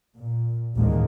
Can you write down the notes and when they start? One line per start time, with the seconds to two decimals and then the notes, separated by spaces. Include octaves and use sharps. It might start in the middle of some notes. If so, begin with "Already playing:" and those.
0.17 A#2
0.77 A1 D2 G#2 D#3 G#3 A#3